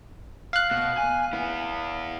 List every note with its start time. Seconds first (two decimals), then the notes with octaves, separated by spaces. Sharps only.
0.53 F5 F#6
0.71 B2
0.98 G#5
1.33 B3 E4